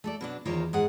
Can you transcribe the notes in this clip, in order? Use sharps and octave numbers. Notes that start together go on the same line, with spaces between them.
A3 A4 D5
B2 F#3 D4
E2 D#3 A#3 F4 C5 C#5
G#2 G#4 F#5